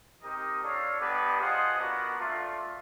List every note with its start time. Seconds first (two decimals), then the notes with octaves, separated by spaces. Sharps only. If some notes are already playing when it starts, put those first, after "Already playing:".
0.23 C4 D#4 G4 A#4 D#5
0.62 D4 F4 A4 C#5 F5
1.01 B3 D4 G4 B4 D#5
1.40 F4 G#4 C5 D#5 F#5
1.79 B3 D4 F#4 A#4
2.19 A3 D4 F4